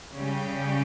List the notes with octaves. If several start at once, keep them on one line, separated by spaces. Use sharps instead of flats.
C#3 G3 C#4 G4